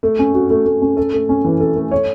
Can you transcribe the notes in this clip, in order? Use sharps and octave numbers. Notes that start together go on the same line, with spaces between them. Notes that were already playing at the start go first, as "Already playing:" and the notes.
A3
C#4
F#4
A3
A3
C#4
A4
A3
C#4
E3
A4
A3
C#5